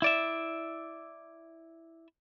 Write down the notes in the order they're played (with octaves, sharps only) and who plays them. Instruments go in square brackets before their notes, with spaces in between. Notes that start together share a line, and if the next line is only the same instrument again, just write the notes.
[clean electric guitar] E4 D5 E5